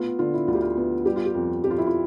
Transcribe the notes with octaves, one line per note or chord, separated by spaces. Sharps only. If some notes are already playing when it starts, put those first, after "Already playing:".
Already playing: A3 B3 F4
D3 F4
E4
D2 F4
G4
F4
B3
G3 G4
F4
G4
F2
F2 G4
F4
E4
F4